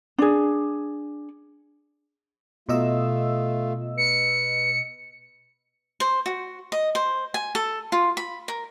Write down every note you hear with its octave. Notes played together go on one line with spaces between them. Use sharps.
D4 G#4
B2 A3 F4 D#5 E6
B4 C#7
C5
F#4
D#5
C5
G#5
A4
F4
B5
A#4